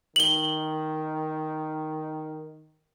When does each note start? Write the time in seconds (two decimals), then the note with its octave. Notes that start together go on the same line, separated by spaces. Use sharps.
0.16 D#3 F#7 G7